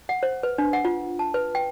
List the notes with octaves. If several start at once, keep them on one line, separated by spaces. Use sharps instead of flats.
F#5
C5
B4
D4
F#5
F4
A5
B4
G5